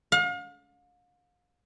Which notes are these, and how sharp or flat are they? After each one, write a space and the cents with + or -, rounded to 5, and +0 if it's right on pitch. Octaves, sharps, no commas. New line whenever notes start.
F5 +40